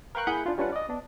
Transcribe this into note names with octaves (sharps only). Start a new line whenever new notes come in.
A#4 B4 F5 G5 C#6 F#6
A#3 E4 G#4 F#5 B5 G6
D4 F4
G3 C#4 D4 F4 B4 F#5
D5 D#5
B3 D4